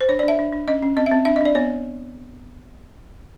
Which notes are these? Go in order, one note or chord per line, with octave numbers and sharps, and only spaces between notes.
C5
D4 C#5
D5
D4 E5
D4
D4
C#4 D#5
C#4
C4 D#5
E5
C4
D4 E5
D#5
D4 D5
B3 C#5